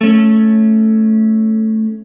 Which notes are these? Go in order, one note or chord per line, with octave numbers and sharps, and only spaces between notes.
A3 C#4